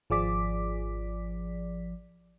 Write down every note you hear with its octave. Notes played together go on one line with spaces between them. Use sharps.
G#1 F3 G#4 D5 D6 B6